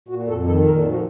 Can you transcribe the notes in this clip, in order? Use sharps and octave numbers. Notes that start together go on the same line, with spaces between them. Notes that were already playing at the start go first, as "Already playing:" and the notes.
A#2 F#4
F2 A4
D#3 A4
A#2 A#4
A4
F3
F#4